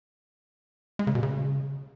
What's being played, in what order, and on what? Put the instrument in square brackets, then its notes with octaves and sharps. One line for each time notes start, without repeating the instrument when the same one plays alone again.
[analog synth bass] G#3
C#3
B2
C#3